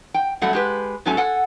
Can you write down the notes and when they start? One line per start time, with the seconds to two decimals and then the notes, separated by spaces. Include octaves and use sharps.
0.14 G5
0.41 F#2 F#3 G3 A3 F#5
0.53 G#3 G4 B4
1.05 G#2 F#3 A3 C#4 A4 G#5
1.17 A4 F#5 G#5